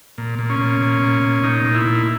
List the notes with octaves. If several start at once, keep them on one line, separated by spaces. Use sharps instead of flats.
A#2
A#2
C#4
A#2
A#2
A#2
A#2
A#2 D#4
A#2
E4
A#2